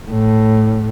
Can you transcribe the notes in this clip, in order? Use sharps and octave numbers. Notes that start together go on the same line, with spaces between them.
A2